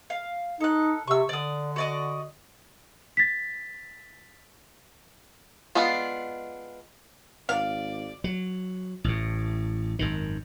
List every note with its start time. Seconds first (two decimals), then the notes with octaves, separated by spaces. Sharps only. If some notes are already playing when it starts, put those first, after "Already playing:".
0.10 F5
0.60 D#4 A4 F#6
1.07 C3 C#6 E6
1.29 D3 D5 D#6
1.76 F#4 D5 D#5
3.17 A6 B6
5.75 G#3 B3 D4 F4
7.49 G#1 D5 F5
8.24 F#3
9.04 A1 A2
9.99 G#1 F#2 D#3